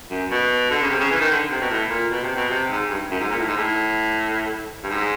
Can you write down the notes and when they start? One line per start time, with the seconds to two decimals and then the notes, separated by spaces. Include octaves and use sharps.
0.10 F#2
0.31 B2
0.71 D3
0.82 C#3
0.91 C3
1.00 C#3
1.11 E3
1.20 D#3
1.31 D3
1.51 C3
1.61 B2
1.70 A2
1.90 A#2
2.11 B2
2.23 C3
2.36 B2
2.50 C3
2.70 G#2
2.90 G2
3.10 F#2
3.20 G#2
3.30 A#2
3.38 A2
3.47 G#2
3.56 A2
4.83 G2
4.90 G#2